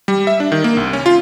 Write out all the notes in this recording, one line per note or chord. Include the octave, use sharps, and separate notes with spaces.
G3
E5
D4
D#3
A#3
C2
C#4
F4